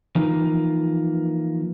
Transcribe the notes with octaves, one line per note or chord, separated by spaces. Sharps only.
E3 F3 A#3 D#4 F4